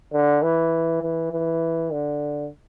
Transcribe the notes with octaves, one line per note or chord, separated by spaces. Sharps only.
D3
E3
E3
E3
D3